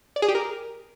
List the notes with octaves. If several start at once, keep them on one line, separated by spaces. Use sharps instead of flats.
D5
G#4
G4
A#4